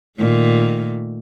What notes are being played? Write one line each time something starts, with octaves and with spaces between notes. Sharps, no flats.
A#2 D#3 A3